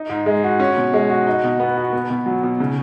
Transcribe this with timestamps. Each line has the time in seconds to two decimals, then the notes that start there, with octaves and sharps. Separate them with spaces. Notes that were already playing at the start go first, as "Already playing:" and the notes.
Already playing: D#4
0.09 G#2
0.26 G#3
0.44 F#4
0.60 C#4
0.77 B2
0.93 G#3
1.10 F#4
1.27 D#4
1.44 B2
1.60 B3
1.77 F#4
1.93 B3
2.10 B2
2.26 F#3
2.43 B2
2.60 C#3